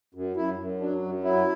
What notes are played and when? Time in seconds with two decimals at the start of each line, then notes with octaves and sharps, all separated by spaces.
0.15 F#2
0.36 F#2 E4
0.59 F#2
0.80 F#3 D4
1.02 F#2
1.24 F#3 E4